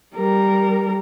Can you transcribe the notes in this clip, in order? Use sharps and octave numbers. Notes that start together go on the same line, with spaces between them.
G3 A#4